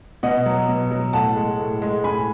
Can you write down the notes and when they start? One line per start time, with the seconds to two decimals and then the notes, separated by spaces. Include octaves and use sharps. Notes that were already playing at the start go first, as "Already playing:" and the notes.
0.23 B2 D#5 F#5
0.46 F#3
0.68 B2
0.91 F#3
1.13 A2 F#5 A5
1.36 G#3
1.59 A2
1.82 G#3
2.04 A2 G#5 B5